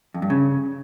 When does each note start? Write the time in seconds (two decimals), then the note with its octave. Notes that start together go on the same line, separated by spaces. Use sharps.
0.14 F2
0.22 G2
0.30 C#3